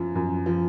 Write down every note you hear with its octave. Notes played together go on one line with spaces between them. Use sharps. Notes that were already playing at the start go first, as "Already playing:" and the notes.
Already playing: F#2 F3
F#2
F3